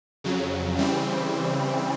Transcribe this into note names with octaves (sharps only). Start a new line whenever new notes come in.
F2 C#3 F#3
C#3 E3 G3 C4